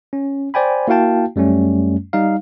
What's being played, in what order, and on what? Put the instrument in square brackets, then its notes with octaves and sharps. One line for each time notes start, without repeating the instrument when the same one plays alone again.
[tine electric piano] C#4
C5 D5 G5 G#5 B5
A#3 E4 F#4 F5 G5 A5
F#2 G3 A3 C#4
G3 D#4 F5